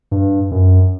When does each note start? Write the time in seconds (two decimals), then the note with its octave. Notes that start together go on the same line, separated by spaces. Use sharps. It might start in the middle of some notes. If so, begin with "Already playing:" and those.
0.12 G2
0.51 F#2